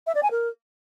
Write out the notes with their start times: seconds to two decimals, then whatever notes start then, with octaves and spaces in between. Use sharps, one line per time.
0.07 E5
0.15 D5
0.23 G#5
0.31 A#4